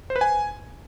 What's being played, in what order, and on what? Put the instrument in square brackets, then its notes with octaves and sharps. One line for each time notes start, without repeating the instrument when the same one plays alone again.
[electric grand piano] C5
B4
G#5